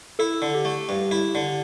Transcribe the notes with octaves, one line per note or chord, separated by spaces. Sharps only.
E4 A4
D3
G4
A3
G2
E4
D3